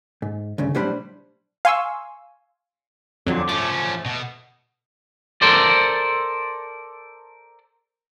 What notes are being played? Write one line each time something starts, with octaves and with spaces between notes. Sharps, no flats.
G#2
D2 G2 C#3
B1 A2 G3 D4 C5 B5
F5 G#5 C6 C#6 E6
F2 A#2 D3 F#3
F3 A3 C#4 D6
B2
A4 A#4 C5 D5